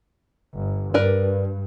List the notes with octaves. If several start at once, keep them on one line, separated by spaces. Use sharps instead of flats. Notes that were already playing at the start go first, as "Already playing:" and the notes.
G1
G2 A#4 B4 D5